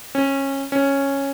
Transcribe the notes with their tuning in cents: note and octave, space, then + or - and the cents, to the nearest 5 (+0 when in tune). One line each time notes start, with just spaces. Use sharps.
C#4 -20
C#4 -5